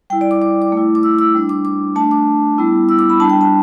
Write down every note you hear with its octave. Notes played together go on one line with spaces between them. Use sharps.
G3 E4 G5
D5
D6
D6
D6
A3 E4
D6
E6
E6
G3 D4
D6
D6
A3 D4 A5
D6
G3 B3 E4
E6
D6
B5
G3 D4 A5
G5
A5